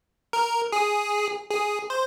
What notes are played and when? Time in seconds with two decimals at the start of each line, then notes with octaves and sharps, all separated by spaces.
0.33 A#4
0.72 G#4
1.51 G#4
1.90 C5